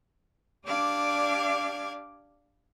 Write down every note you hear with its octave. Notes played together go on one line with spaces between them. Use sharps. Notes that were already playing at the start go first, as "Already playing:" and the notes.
D4 G4 D5 F5 D6 G#6